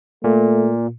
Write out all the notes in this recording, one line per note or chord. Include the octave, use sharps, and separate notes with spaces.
A#2 A3